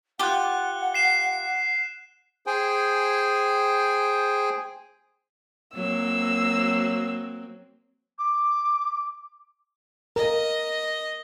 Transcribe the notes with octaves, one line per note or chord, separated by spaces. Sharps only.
F4 G4 F#5 F#6 G7
C7 E7 G7
G#4 C5 G5 G#5
F#3 A#3 C4 E6
D6
A#4 D#5